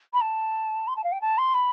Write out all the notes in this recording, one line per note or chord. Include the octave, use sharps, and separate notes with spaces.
B5
A5
C6
A5
F5
G5
A5
C6
B5